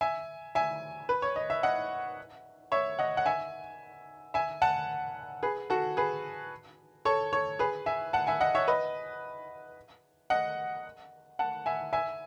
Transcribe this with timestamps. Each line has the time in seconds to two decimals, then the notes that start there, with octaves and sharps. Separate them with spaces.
0.01 E5 G#5
0.55 E5 G#5
1.09 B4
1.22 C#5
1.36 D#5
1.50 E5
1.63 D#5 F#5
2.72 C#5 E5
2.99 D#5 F#5
3.17 F#5
3.26 E5 G#5
4.34 E5 G#5
4.62 F#5 A5
5.43 G#4 B4
5.70 F#4 A4
5.97 G#4 B4
7.05 A4 C#5
7.33 A4 C#5
7.59 G#4 B4
7.86 E5 G#5
8.13 F#5 A5
8.27 E5 G#5
8.40 D#5 F#5
8.55 C#5 E5
8.68 B4 D#5
10.30 D#5 F#5
11.39 F#5 A5
11.66 E5 G#5
11.93 E5 G#5